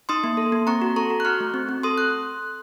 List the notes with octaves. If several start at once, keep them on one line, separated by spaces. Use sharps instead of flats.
D#4 C6 D#6
A#3
A4
A#3
C4 A#5 C#6
F#4
A4 A#5 C#6
F#4
F#6
F#4 C#6 F6
A3
C4
C4
A4 C6 D#6
F#6